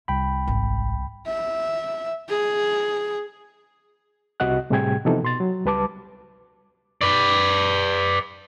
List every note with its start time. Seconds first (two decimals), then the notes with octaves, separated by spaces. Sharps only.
0.08 C2 E4 G5 B5
0.47 G#1
1.27 E5
2.29 G#4
4.40 C2 C3 F#4 D#5 F#5 F#6
4.70 A2 C3 G3 G#4 G5 G#6
5.05 C3 E3 F3 B3 D#4 A4
5.23 B2 C6 A6
5.40 F#3
5.65 C#2 G3 B4 A5 D6
7.01 B4 D5